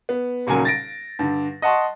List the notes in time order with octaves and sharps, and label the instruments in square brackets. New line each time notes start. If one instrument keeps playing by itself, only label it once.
[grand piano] B3
D#1 A#2 C#3 F#3 G#5
A6 A#6 D7
G2 D3
D#5 F#5 A5 C6 C#6